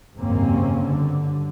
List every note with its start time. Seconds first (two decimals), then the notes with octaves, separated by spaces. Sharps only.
0.17 F#1 D#2 G#2 A#3 C4 C#4
0.81 G2 D3